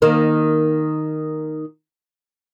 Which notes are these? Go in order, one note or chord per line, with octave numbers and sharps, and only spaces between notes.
D#3 A#3